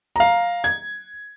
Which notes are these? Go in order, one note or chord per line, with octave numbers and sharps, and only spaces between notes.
F5 A#5
G#6